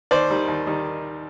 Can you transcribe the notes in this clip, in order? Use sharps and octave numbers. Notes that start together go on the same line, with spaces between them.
D#2 C5 D5
D#3 G3
D#2
D#3 G3